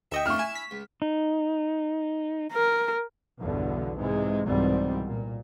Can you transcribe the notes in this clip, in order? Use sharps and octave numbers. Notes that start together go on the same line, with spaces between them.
D2 D#5 E5 G5 C#6
F3 A3 D4 C#6 F6
E4 G#5 E7
B6
C#2
D#4
A#4
B1 E2 G2 B2 D3
G#2 C3 E3 G#3
C2 G#2 B2 E3 G3 C4
A#2